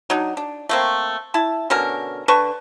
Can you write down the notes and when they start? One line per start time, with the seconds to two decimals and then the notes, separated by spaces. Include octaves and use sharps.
0.10 F#3 D4 D#4
0.37 D4
0.69 A3 A#3 C4
1.34 E4 A5
1.70 B2 D3 C#4 A#4
2.28 D3 B4 A5 C#6